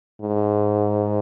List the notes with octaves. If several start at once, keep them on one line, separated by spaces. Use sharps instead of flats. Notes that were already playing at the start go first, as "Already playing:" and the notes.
G#2